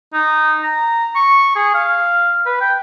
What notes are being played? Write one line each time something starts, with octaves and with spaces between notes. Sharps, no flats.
D#4
A#5
C#6
G#4
F5
B4
G5